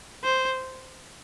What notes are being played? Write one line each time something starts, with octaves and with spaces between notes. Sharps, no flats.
C5